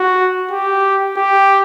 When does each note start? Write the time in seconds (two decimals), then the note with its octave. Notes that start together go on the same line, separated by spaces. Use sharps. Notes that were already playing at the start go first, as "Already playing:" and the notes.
Already playing: F#4
0.51 G4
1.16 G4